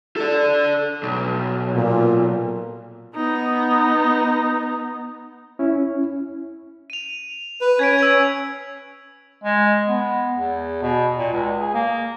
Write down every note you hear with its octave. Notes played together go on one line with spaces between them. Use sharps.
A4 D5
B1
A#2
B3 D#4
C#4 E4
D#7 F7
B4
C#4 G#6 B6 D7
E6 G#6
G#3
B3
E2
B2
A#2
C#2
G#4
A#3